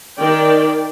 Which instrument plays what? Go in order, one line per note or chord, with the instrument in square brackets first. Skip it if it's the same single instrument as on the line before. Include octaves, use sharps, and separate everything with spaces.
[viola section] D#3 D5 G5